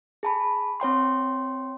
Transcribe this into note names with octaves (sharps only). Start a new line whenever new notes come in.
G#4 A5 B5
C4 C#5 G5 C6